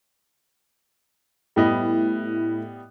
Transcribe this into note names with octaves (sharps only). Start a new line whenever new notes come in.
A2 G3 B3 D#5